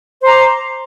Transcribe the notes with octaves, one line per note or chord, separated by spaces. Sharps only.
C5 A#5 C6 D6